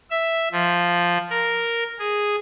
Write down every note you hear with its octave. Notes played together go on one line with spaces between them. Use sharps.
E5
F3
A#4
G#4